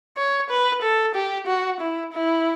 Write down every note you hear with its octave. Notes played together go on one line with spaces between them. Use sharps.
C#5
B4
A4
G4
F#4
E4
E4